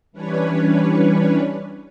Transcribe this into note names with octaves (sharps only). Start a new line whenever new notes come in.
E3 G3 C#4 D4 B4 C#5